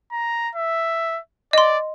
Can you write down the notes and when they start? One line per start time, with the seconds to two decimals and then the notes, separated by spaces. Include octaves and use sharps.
0.12 A#5
0.55 E5
1.53 D5 D#5 C6